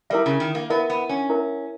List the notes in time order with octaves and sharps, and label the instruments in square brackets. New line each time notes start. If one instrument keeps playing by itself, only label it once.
[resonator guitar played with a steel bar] G3 [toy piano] E4 A#4 E5
[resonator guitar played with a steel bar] C#3
D#3
A#3
[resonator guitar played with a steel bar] B3 [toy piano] E4 A#4 E5
[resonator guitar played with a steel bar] B3
C#4
[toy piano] E4 A#4 E5